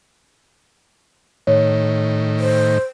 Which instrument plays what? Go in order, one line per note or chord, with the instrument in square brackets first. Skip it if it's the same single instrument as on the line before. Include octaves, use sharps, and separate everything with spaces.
[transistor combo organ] A2 D#3 [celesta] C#5
[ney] C5